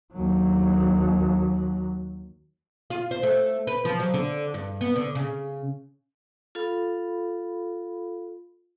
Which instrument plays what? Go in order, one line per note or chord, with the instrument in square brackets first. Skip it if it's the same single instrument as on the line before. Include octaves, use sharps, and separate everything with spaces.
[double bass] D#2 F#3
[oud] F4
C5
A3
B4
F3
F#3
D3
G2
B3
D3
C#3
[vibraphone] F4 A4 F5 B5